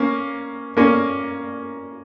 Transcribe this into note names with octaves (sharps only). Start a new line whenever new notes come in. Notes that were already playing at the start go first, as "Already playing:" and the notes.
Already playing: A#3 C#4
A#3 C#4